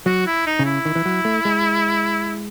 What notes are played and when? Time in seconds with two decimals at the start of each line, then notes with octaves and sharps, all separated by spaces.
0.06 F#3 F#4
0.26 E4
0.46 D#4
0.59 C#3
0.65 E4
0.85 D#3
0.95 E3
1.06 F#3
1.25 A3
1.45 G#3